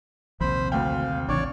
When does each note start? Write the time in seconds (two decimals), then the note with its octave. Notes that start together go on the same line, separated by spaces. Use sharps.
0.41 A#1 D#2 C3 F3 C5 B5
0.72 D2 F5 G5
1.29 A1 C#3 E3 D4 C#5 D5